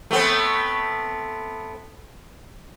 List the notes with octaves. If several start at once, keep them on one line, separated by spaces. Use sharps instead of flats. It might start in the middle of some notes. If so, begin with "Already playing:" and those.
A3 B3 C4